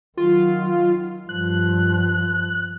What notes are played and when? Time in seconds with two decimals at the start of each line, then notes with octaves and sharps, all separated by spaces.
0.17 D#3 F#3 F4
1.29 G2 F3 F#6